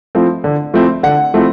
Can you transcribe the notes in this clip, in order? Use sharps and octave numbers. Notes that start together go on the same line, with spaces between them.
F3 A3 C4 E4
D3
F3 A3 C4 E4
D3 F#5
F3 A3 C4 E4